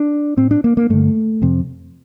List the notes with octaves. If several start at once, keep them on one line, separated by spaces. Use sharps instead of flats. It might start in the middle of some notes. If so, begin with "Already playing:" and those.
Already playing: D4
A2 C4
D4
A#3
A#3
G2 D3 A3
F2 C3